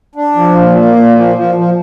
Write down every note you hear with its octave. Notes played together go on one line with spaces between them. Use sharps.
D4
F3
A#2
A#3
A#2
F3
F3
F3